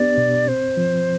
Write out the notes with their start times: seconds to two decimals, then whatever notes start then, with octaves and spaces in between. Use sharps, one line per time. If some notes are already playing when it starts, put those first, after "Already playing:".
Already playing: B3 D4 G4 D5
0.17 B2
0.47 C4 C5
0.77 F3